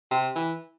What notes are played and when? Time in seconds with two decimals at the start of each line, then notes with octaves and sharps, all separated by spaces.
0.11 C3
0.36 E3